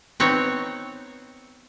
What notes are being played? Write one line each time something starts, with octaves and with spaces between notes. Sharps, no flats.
B3 C4 D#4 C#5